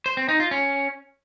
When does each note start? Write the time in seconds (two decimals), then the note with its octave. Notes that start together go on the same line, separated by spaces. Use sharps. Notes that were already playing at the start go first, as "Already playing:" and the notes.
0.06 C5
0.17 C4
0.29 D#4
0.40 F4
0.51 C#4